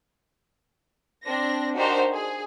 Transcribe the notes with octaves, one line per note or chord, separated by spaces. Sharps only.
C4 D4 A#6
D4 D#4 F#4 G4 A#4 C5
G#4